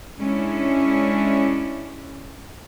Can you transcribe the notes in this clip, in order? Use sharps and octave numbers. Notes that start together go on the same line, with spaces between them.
G#3 C#4 D4 E4